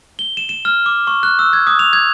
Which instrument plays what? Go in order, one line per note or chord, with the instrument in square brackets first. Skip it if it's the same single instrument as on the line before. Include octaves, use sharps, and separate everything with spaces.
[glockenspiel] G7
E7
E7
F6
D6
C#6
F#6
E6
G#6
D#6
F7
G#6